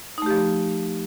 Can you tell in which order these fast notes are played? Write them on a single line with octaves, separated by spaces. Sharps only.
D#4 A3 G4 F3